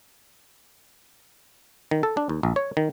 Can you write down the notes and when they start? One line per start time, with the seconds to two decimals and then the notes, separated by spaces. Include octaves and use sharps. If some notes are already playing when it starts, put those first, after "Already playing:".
1.91 D#3
2.03 A4
2.17 D4
2.29 D#2
2.43 A#1
2.56 C#5
2.77 D#3